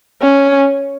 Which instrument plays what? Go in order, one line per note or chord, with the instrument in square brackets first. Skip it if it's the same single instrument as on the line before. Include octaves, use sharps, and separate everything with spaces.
[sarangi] C#4